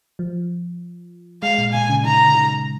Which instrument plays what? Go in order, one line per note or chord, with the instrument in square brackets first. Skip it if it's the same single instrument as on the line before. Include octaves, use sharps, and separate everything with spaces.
[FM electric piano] F3
[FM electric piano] G#3 [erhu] F5
[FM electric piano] A#2
[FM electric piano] A#2 [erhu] G#5
[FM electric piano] C#3
[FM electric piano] D#3 [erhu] A#5
[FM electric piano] C#3
D#3